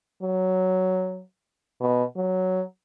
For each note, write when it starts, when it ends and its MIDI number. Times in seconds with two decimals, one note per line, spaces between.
0.23 1.22 54
1.81 2.04 47
2.16 2.63 54